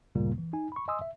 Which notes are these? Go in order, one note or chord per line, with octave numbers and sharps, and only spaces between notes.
D2 G2 A#2 C#3 G3 A#3
E3
D#4 G#5
B5 C#6
D#5 G#5 C6 D#6 E6
E5